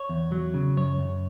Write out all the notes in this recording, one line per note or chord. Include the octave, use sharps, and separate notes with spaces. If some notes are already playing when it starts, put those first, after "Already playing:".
Already playing: C#5
E2
F#3
C#3
F#2 C#5
F#2